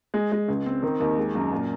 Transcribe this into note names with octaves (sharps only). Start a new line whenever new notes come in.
G#3
G#3
C#2
C4
D#3
D#2
G#3
F#2
A#2